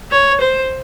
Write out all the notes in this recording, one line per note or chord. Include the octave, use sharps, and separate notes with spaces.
C#5
C5